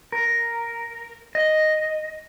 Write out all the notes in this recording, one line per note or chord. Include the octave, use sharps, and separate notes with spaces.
A#4
D#5